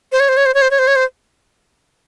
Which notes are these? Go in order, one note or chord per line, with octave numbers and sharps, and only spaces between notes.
C5
C#5
C5
C#5
C5
C#5
C5
C#5
C5
C#5
C5